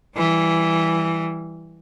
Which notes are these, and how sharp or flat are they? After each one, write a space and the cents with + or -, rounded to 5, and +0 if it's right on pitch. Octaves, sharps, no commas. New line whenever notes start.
E3 +0 G3 +0